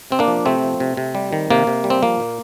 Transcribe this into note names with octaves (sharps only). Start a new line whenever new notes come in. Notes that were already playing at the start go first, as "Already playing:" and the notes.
C3 C4
A#3 D4
F3
C3 A3 C4
F3
C3
C3
G3
D#3
C3 A#3
C3
G3
C4
F3 A#3
A#2